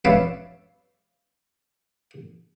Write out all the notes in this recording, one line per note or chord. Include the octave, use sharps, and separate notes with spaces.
B4 C#5 D5 E5 F5